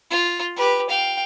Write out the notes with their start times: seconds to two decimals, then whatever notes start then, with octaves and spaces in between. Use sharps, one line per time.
0.10 F4
0.56 G4 B4
0.90 F5 G5